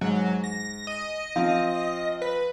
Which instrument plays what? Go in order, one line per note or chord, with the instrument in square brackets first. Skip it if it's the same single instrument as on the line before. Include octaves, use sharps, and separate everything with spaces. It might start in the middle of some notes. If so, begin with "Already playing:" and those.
[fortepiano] G#2 [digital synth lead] F#3
[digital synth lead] A#6
D#5
[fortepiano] F3 C4 F5
[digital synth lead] B4